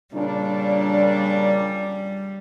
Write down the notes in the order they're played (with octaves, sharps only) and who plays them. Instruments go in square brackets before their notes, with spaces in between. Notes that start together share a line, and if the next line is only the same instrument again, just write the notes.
[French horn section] A#2 C#3 D4 [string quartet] G3